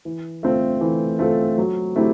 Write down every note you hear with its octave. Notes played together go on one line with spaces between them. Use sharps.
E3
A3 C4 F4 A4
E3
A3 C4 F4 A4
F#3
A3 C4 E4 G4